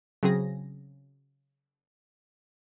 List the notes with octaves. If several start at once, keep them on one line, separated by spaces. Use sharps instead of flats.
C#3 F#3 C4 G#4 A#6